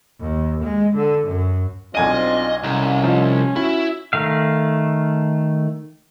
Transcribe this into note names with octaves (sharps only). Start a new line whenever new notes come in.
D#2
G#3
D3
F#2
B1 C4 D4 F4 D#5 G#5 D#7
C2 C#4
F3 D#4
E4 F#4
D#3 A3 F5